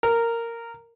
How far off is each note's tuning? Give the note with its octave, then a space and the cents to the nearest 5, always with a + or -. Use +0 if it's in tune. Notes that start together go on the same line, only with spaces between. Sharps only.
A#4 -10